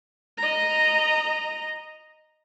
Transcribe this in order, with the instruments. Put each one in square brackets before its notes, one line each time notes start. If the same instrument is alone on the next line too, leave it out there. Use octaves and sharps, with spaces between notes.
[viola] D#5 A#5